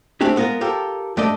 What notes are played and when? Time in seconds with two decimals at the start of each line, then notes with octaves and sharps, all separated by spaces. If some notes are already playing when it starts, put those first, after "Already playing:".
0.21 A3 C4 D4 G4 G#4
0.36 G#3 B3 F4 A#4
0.61 F4 G4 A4 A#4
1.17 G2 A3 D5 D#5